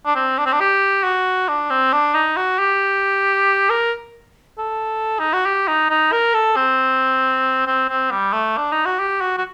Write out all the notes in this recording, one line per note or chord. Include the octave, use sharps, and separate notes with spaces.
D4
C4
D4
C4
D4
G4
F#4
D4
C4
D4
D#4
F#4
G4
A#4
A4
D#4
F#4
G4
D#4
D#4
A#4
A4
C4
C4
C4
G3
A3
D4
D#4
F#4
G4
F#4
F#4